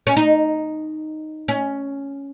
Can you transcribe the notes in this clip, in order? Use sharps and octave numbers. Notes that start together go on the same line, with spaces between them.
C#4
D#4
C#4